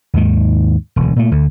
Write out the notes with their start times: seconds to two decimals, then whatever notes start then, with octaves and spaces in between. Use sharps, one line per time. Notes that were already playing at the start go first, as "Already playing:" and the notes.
0.14 D#2 G#2 D#3
0.96 E1 D2
1.16 A#2 A3
1.31 D2 D3